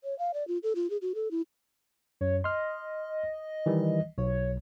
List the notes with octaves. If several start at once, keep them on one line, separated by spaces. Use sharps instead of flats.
C#5
F5
D5
F4
A4
F4
G#4
F#4
A4
E4
F#2 C#5
D#5 C6 F6
D#3 E3 G3
B1 C#5